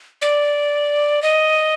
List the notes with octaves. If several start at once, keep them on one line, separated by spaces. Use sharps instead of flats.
D5
D#5